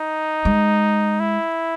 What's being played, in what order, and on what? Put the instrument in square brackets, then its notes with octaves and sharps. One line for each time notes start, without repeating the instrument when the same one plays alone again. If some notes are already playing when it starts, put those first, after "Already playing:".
Already playing: [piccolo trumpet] D#4
[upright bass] G#3
[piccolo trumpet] E4